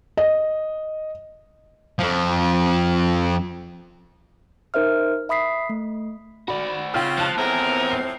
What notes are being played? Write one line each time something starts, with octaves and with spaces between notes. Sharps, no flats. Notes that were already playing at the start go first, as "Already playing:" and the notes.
D#5
F2 F3
D#4 A#4 C5 E5 F6
E5 B5 D#6 B6 C7
A3
F#4 D5 B5
C#3 C4 F4 F#5 G5 F6
F3 A5 F#6 C#7
F2 A2 B3 C4 G#4 A#4
C7